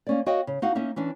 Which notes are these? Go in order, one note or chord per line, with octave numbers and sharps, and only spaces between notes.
A#3 C#4 D5
F#4 C#5 D#5 F5 G5
C#3
D#4 F#4 F5 F#5
A#3 C#4 D#4 E5
E3 C#4 D4